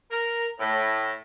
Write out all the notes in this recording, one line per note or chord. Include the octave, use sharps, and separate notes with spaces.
A#4
A2